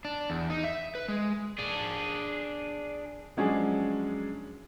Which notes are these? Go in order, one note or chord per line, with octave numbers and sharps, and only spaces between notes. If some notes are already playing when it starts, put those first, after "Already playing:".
D4
E2
D#4
E5
B4
G#3
D4 G#4
F3 F#3 G#3 C#4 D4 G#4